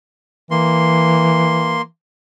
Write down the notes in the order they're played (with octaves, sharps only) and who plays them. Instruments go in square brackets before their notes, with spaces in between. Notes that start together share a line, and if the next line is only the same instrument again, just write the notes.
[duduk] E3 [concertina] A#3 C6